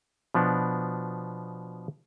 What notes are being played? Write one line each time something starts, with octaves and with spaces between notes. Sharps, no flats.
B2 F3 B3 D4